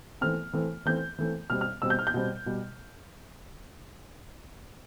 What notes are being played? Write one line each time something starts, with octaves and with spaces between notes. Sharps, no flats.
E3 A3 C4 F6
E3 A3 C4
E3 A3 C4 G6
E3 A3 C4
B2 G3 C4 F6
F6
B2 G3 C4 E6
G6
F6
G6
B2 G3 C4
B2 G3